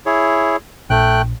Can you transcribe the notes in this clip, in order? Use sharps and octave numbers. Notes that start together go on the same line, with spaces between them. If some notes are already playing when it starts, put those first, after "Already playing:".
E4 G#4 C#5
A#1 A3 G5 F#6